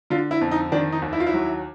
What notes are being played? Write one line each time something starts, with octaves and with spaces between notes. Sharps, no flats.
D3 F4
E4
F2
D#4
D#3 D4
D#4
D#2
E4
F4
E4
F#3